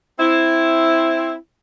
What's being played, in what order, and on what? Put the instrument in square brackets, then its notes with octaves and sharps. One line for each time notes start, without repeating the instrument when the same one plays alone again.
[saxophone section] C4 E4